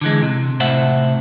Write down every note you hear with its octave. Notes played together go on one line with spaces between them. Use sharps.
D3 E3 G#3
C3
A2 C3 C5 E5 F#5